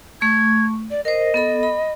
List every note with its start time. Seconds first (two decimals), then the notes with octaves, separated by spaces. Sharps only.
0.21 A3 C#6 G#6
0.91 D5
1.05 A#4 C5 D#5
1.34 B3 A4 B5
1.63 B5